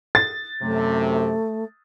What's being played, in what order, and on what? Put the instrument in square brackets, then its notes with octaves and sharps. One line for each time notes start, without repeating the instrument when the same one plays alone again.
[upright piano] A6
[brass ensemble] F#2 C3 [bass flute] A3